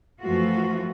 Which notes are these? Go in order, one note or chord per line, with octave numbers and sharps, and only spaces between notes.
F#2 E3 F3 A3 F4 F#4